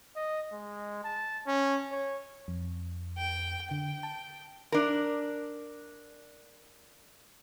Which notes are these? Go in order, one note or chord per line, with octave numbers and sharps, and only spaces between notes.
D#5
G#3
A5
C#4
C#5
F2
G5
D3 G5
A5
D4 A#4